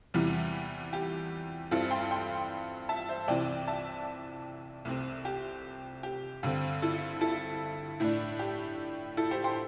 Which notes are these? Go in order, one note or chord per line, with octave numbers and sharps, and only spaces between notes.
E2 C3 E3 G3
G4
G2 G3 C4 E4 A4
G5 C6
G5 C6
E5 A5
C5 E5
C2 C3 E3 C4 D5 G5
E5 A5
C2 C3 A3 C4
G4
G4
G2 D3 C4
E4 A4
E4 A4
A2 A3 D4 E4
G4
E4 A4
G4 C5
G5 C6